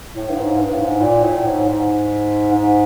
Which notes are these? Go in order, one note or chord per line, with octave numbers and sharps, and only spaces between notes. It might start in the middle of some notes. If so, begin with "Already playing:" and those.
A2
G2
G#2
G2
A2
G#2
A#2
A2
G#2
G#2
G#2